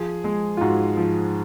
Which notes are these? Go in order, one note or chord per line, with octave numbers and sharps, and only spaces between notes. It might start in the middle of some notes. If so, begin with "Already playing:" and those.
Already playing: F3 G#4
G#3
F4
G#2 F#4
F3